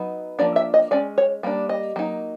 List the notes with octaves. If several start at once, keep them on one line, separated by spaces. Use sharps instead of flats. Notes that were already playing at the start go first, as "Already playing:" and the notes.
Already playing: F#3 B3 D#4
F3 A#3 D4 D5
E5
D#5
G#3 C#4 D5
C#5
G3 A#3 D4
D#5
F#3 A#3 D#4